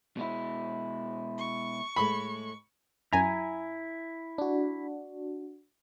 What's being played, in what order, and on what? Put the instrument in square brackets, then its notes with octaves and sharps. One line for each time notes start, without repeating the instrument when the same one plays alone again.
[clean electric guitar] B2 G#3 E4
[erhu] C#6
[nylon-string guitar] A2 G#3 A3 [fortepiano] B5
[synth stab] F#2 G#5 A#5 [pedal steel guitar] E4
[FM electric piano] D4 F#4